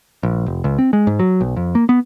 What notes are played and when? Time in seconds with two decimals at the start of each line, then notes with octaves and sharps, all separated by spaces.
0.23 A#1
0.46 F1
0.64 C#2
0.79 C4
0.93 G#3
1.07 G#2
1.19 F#3
1.41 B1
1.56 F2
1.75 A#3
1.89 B3